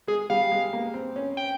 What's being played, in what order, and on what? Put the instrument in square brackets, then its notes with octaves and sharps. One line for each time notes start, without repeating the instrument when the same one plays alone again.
[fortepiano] G#3 [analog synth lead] G#4
[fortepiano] G3 [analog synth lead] F5
[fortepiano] G#3
A#3
C4
C#4
[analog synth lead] G5